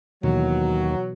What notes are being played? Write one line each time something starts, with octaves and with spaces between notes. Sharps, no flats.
D#2 B2 E3 F#3